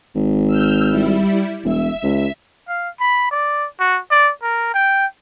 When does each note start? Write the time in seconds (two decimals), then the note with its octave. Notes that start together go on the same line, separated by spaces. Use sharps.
0.15 G#1
0.47 E6 F6 G6
0.90 G3 E4
1.64 E1 E5
2.03 C#2
2.68 F5
3.00 B5
3.31 D5
3.80 F#4
4.11 D5
4.43 A#4
4.74 G5